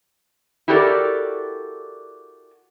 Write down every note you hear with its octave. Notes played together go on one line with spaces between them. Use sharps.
E4 F#4 G4 A4 A#4 D5